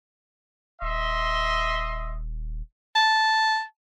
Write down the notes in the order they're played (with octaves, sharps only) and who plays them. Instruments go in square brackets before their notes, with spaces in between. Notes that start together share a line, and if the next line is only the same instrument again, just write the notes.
[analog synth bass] D#1 [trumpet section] D#5 E5 C6
[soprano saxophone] A5